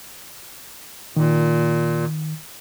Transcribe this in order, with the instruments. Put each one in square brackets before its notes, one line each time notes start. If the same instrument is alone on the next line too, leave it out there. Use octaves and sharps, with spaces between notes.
[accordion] A#2 [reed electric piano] D#3